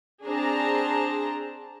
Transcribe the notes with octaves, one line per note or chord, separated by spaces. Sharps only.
C4 D4 G#4 C5 A5 A#5